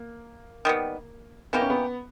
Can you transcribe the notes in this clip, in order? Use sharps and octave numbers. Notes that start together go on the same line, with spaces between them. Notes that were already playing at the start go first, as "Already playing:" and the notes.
Already playing: A#3
D#3 G3 B3
E3 A#3 B3 D#4 G4
C#4
B3